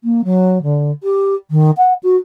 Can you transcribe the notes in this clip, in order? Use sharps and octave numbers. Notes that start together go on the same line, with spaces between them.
A#3
F#3
D3
G4
D#3
F#5
F#4